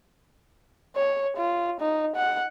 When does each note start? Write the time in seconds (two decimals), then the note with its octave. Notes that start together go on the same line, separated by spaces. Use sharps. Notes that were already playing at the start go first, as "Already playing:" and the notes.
0.96 C#5
1.37 F4
1.81 D#4
2.16 F#5